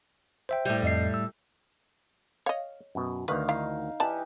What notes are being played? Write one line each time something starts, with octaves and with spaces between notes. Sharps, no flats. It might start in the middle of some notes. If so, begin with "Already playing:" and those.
C5 E5 G5
A2 G3
F2 D#5 C7
E6
C#5 D#5 F5
F#2 B2
D2 D#3 B4 F5
D#4 E4 F5
E3 D#4 G4 D5 A5